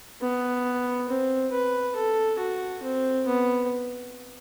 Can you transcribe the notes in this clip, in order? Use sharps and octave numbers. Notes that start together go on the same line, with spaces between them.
B3
C4
B4
A4
F#4
C4
B3